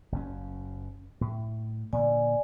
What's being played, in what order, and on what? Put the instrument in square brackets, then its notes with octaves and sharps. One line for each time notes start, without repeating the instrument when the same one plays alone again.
[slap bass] F#1 F#2 C#4
A2
[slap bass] A#2 D3 [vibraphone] D5 G#5